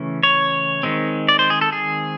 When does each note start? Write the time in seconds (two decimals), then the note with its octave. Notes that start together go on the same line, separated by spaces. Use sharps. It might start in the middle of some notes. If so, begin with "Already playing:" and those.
Already playing: C#3 E3 A3 C#4
0.23 C#5
0.83 D#3 G#3 C4
1.29 D5
1.39 C5
1.50 G#4
1.61 A4
1.72 G#4